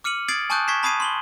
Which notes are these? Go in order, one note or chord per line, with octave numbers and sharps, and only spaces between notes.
D6 F6 C#7 D#7 F#7
D#6 G#6 A6 C7 D7 F#7
G#5 A5 C#6 D#6 F#6 G6
C#6 G#6 B6 C7 E7
A5 B5 D#6 G#6 C7 D#7
C6 F#7 G7